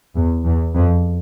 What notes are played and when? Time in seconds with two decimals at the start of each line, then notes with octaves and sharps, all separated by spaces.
0.16 E2
0.45 E2
0.75 F2